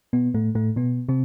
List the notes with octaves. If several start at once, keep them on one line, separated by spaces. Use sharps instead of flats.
B2 B3
A2 A3
A2 A3
B2 B3
C3 C4